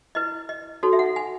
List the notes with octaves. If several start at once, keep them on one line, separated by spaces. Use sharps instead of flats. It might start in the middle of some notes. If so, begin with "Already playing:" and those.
E4 B4 D#5
D#5
D#4 F#4 A4 C#5
E5
F#5
G#5